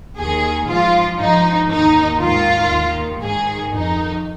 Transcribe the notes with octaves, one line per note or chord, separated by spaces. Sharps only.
D#2 D#3 G#4
G#2 F3 F4
G#2 F3 D#4
D#2 D#3 D#4
G#2 D#3 F4
D#2 D#3
G#2 D#3 G#4
F2 D#3 D#4